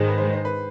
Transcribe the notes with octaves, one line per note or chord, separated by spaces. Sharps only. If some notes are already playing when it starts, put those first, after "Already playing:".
Already playing: G#2 D#3 G#3 C5
B4
C5
C5
B4